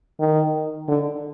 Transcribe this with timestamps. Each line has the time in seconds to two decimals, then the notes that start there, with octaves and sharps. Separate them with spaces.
0.20 D#3
0.88 D3